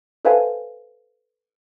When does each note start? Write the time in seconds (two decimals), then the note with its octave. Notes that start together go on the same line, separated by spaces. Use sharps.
0.25 A4 B4 C5 E5 F5 G#5